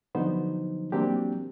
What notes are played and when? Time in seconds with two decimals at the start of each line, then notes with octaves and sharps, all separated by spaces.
0.15 D3 F3 F#3 B3 D#4 C5
0.92 E3 F#3 A#3 C4 D4 G4